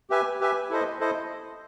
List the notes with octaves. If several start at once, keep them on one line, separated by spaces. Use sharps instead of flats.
G4 B4 E5 G#5
G4 B4 E5 G#5
E4 A4 C5 D#5
E4 A4 C5 D#5